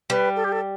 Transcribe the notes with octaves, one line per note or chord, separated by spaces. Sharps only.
G3 B4
A4
G4
A4